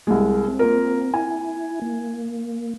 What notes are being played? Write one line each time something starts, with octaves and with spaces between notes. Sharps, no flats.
C2 G#3
C4
A#3 F4 A#4
E4 G#5
A#3